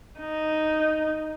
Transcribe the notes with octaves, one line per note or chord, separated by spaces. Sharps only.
D#4